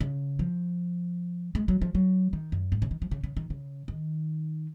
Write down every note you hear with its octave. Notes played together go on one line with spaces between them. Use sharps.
C#3
F3
G#3
F#3
F3
F#3
D#3
F#2
G#2
C#3
D#3
F3
C#3
C#3
D#3
C#3
D#3